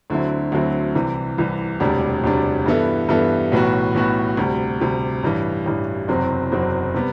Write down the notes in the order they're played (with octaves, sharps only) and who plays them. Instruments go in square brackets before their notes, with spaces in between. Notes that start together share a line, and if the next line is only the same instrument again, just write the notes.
[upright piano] D2 D3 F#3 C4 E4
D2 D3 F#3 C4 E4
C2 C3 E3
C2 C3 E3
E1 D2 C3 G3 D4
E1 D2 C3 G3 D4
G2 E3 B3 E4 A4
G2 E3 B3 E4 A4
B1 A2 E3 B3 F#4
B1 A2 E3 B3 F#4
D2 C3 G3
D2 C3 G3
A1 G2 E3
A1 G2 E3
F#1 E2 C3 F#3 C4
F#1 E2 C3 F#3 C4
C3 G3 B3